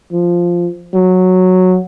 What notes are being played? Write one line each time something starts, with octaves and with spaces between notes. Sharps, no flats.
F3
F#3